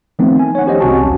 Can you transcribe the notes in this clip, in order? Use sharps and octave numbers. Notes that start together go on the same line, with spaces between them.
D#3 F3 A3 B3 C4 D#4
G#5
C#5 F#5
C#4 G4 C5 D#5
C2 C3 C#4 F#4 A5
A#1 D#2